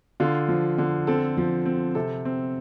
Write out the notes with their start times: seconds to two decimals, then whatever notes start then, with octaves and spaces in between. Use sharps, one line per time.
0.20 D3 F4
0.49 F3
0.78 D3
1.07 C4 A4
1.37 F3
1.66 C4
1.95 C3 A4
2.25 C4